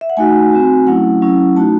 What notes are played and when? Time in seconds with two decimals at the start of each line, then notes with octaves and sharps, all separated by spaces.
0.01 E5
0.10 F#5
0.17 A3 D#4 F#4 G#5
0.52 C4 F#4
0.87 F#3 A3 C#4 E4 F#5
1.22 F#3 C#4 E4
1.56 A3 D#4 F#4 A5